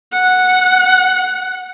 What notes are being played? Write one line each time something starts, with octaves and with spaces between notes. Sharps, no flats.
F#5